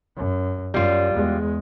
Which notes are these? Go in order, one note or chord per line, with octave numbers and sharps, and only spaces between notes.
F#2
F#2 G3 F4
E2 G#3